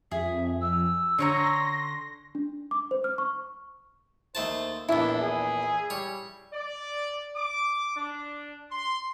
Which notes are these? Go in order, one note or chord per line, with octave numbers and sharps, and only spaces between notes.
F2 G#4 E5
E6
D3 C#5 A#5 C6 A#6
D4
D6
C5
F6
C#6
D#2 A3 C5 A5
A#1 E2 D4 E4
G#4
G3 C#5
D5
D6
D4
C6